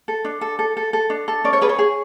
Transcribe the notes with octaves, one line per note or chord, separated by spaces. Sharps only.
A4
D4
A4
A4
A4
A4
D4
A4
C#4 D5
C#5
G#4 B4
C#5
G#4